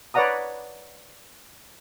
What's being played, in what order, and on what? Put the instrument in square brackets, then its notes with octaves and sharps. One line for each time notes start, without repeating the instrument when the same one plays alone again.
[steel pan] B4 C#5 D5 F#5 A#5 D#6